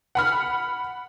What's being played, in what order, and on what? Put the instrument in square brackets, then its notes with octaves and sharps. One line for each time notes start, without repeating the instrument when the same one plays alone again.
[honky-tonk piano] F#5 B5 F6